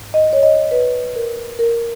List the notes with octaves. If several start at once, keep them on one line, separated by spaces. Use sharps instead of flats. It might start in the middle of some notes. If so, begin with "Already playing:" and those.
Already playing: G#2
D#5
C#5
D#5
B4
A#4
A#4